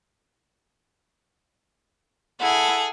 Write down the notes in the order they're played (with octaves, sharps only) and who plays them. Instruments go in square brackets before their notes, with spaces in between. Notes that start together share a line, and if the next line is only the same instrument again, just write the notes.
[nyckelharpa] E4 F#5 [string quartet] G#4 A4